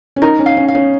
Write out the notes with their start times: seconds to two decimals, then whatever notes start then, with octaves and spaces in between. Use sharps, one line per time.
0.16 C#4
0.22 D#4 A#4
0.39 C#4
0.46 F5
0.57 C#4
0.68 F5
0.75 C#4